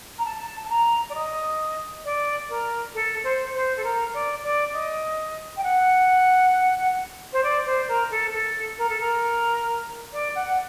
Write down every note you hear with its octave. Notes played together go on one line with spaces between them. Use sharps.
A#5
A5
A5
A#5
D5
D#5
D5
A#4
A4
C5
C5
A4
A#4
D5
D5
D#5
G5
F#5
C5
D5
C5
A#4
A4
A4
A#4
A4
A#4
D5
F#5